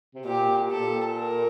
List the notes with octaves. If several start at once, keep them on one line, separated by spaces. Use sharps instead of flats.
C3
A#2 G4
A#2 A4
A#4